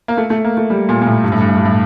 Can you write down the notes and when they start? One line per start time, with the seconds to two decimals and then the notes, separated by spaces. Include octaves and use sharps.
0.08 A#3
0.17 A3
0.30 A3
0.44 A#3
0.57 A3
0.70 G3
0.89 A#2
1.02 A#2
1.06 A2
1.24 G2
1.32 A2
1.40 G2
1.49 A2
1.57 G2
1.65 A2